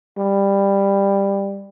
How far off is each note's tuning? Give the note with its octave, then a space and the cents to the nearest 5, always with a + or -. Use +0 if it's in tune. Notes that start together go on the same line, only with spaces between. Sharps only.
G3 +15